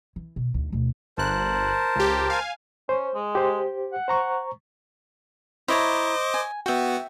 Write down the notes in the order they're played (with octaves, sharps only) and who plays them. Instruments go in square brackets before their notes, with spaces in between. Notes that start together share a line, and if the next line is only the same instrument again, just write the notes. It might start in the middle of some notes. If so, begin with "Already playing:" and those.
[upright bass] E3
B2
D2 D#3
D2 B2
[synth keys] G1 F#6 [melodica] A#4 C5 A5
[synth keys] C#2 G4
F5 G#5
[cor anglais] C#4 [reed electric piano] C5
[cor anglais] G#3
[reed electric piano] G4 C5
[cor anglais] F#5
[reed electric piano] C5 A#5 C#6
[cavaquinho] E4 C#5 A#5 [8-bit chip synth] C5 D#5 D6
[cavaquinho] G#5
[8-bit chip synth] B3 F#4 [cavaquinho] E5 G5